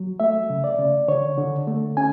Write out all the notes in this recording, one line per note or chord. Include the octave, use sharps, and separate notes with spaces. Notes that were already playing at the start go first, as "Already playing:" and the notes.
Already playing: F#3
A3 E5
C#3
D5
C#3
D3 C#5
D3
A3
C#4 G#5